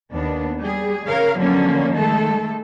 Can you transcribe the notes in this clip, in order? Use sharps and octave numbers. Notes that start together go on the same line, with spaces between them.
D#2 B3 D4
G3 G#4
C#3 A#4 C#5 F5
B2 D3 F3 F#3 A#3 C#4
D#3 G#3 A3 A4